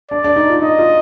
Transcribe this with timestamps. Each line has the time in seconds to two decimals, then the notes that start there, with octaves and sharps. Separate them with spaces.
0.11 D4 D5
0.24 D4
0.36 D#4
0.49 F4
0.62 D#4 D#5
0.79 F4